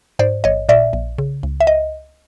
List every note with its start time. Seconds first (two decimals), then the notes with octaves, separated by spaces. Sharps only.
0.19 G#2 C5 D5
0.44 A1 C#5 D#5
0.69 A#2 D5 E5
0.93 A#1
1.18 C#3
1.43 C#2
1.60 E5
1.67 D#5